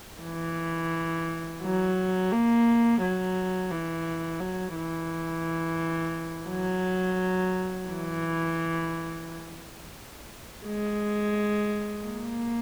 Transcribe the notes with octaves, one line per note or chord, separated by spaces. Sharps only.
E3
F#3
A#3
F#3
E3
F#3
E3
F#3
E3
G#3
A#3